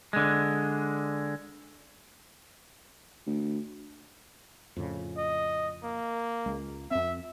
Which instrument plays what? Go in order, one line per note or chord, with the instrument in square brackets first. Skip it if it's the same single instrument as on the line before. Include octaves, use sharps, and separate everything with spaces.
[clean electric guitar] D3 G#3
[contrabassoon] D2
[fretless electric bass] F2 A2 C#3
[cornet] D#5
A#3
[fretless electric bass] C#2 G#3
[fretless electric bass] F2 C4 [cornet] E5